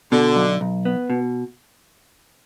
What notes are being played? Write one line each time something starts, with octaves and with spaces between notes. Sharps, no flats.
B2 D3
B1
B1
B3
B2